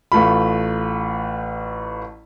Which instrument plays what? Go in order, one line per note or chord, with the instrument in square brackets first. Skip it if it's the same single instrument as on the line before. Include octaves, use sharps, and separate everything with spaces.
[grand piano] A1 A3 F4 B5